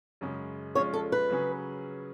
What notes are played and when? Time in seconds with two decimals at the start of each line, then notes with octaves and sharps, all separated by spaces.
0.21 F#2 C#3 G#3 C#4
0.75 F3 G#3 C#4 F4 C#5
0.94 A4
1.12 B4
1.30 C#3 F#3 C#4 G#4